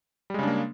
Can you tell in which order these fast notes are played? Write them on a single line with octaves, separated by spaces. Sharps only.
G3 G#3 C#3 D4 A#3